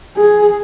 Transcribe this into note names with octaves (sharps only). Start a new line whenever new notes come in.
G#4